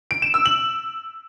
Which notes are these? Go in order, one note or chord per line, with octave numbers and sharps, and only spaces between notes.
D7
E7
E6
F#7